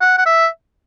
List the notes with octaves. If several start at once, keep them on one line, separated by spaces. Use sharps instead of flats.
F#5
F#5
E5